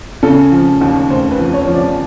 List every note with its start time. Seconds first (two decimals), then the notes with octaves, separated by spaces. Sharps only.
0.23 C#3 A4
0.52 F3
0.81 D#2
1.09 F1 C5
1.31 B4
1.39 F3
1.53 C#5
1.67 F3
1.74 D5